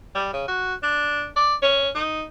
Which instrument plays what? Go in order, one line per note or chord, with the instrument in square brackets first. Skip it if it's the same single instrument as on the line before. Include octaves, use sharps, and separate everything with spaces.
[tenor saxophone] G3
C#3
F#4
D4
D5
C#4
D#4